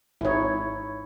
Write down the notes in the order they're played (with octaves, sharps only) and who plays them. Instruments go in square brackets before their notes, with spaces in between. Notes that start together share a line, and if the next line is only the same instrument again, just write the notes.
[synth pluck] G#1 D#4 [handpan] E4 C#5